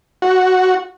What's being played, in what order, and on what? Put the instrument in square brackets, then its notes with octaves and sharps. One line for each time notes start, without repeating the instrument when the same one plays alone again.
[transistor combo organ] F#4